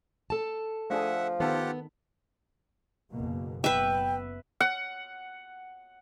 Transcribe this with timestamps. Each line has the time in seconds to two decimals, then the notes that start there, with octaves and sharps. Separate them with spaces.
0.30 A4 A5
0.90 F3 A3 D4 G#4 E5 F#5
1.40 D#3 B3 F4 G4 A4 F#5
3.10 F#1 B2 A#3
3.64 F#1 B3 B4 E5 G5
4.60 F#5